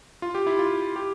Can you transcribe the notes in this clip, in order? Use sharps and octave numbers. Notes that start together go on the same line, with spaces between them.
F4
G4
E4
F4
G4